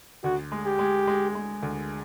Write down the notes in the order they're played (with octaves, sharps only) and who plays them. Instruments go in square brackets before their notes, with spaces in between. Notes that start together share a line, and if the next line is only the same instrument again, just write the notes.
[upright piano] D2 [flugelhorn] F#4
[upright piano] G#3
[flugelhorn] G4
[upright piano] G#3
G#3
G#3
D2